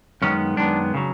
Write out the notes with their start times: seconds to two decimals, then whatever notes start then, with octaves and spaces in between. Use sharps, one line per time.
0.22 F#2 D#3 G#3 B3 C#4
0.57 F#2 D#3 G#3 B3 D4
0.94 C#3 F#3